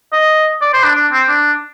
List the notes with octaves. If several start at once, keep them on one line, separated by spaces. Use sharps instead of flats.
D#5
D5
C5
D4
D4
C4
D4